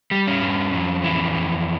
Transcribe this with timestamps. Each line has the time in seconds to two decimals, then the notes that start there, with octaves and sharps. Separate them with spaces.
0.11 G3
0.27 C#4
0.42 G2
0.73 F2
1.04 E3
1.36 F2